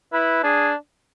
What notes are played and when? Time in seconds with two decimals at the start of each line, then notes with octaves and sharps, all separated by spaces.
0.13 E4 B4
0.43 D4 G#4